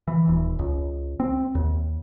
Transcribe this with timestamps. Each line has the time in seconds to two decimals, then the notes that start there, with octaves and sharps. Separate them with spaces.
0.08 E3
0.28 D#1
0.59 C#2
1.20 C4
1.55 D#2